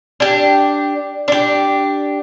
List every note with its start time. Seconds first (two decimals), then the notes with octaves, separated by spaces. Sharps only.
0.20 D4 G4
1.28 D4 G4